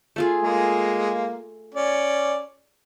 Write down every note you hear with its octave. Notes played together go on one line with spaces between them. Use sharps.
A3 F4 G#4
G#3 A#3
C#4 D5